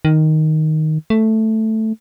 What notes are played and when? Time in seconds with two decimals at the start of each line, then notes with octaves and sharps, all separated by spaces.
0.05 D#3
1.10 A3